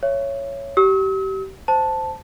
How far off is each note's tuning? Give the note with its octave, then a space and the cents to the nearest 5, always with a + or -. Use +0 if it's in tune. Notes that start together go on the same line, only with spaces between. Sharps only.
C#5 +0 E5 +35
G4 -30 E6 -45
C5 -10 A5 +0